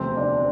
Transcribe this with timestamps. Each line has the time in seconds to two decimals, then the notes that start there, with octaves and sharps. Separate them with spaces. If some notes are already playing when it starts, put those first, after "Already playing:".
Already playing: E1 D2 C3 F3 C4
0.17 D4